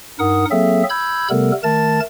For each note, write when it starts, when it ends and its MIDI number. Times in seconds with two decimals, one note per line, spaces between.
0.19 0.45 43
0.19 0.45 63
0.19 0.45 70
0.19 0.45 78
0.19 0.45 87
0.51 0.83 54
0.51 0.83 58
0.51 0.83 60
0.51 0.83 68
0.51 0.83 69
0.51 0.83 76
0.89 1.28 83
0.89 1.28 88
0.89 1.28 91
0.89 1.28 92
1.30 1.52 48
1.30 1.52 55
1.30 1.52 57
1.30 1.52 59
1.30 1.52 69
1.30 1.52 70
1.63 2.00 51
1.63 2.00 57
1.63 2.00 70
1.63 2.00 81
1.63 2.00 93